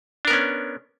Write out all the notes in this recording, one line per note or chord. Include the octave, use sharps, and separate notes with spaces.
B3 C#4 D4 A#4